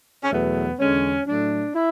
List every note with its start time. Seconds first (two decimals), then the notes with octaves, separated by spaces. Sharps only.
0.23 C#4
0.31 E2 B2 F#3 A3 B3
0.79 E2 D3 G#3 C#4
1.26 A2 F#3 A3 D4
1.74 E4